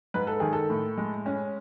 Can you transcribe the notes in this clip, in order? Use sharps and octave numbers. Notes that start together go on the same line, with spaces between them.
G#2 B4
A4
D#3 G#4
A4
A2
G#3
C#4